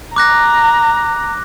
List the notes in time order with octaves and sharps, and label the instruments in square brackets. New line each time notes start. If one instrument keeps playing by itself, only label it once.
[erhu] A#5 [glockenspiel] D6 F#6 A#6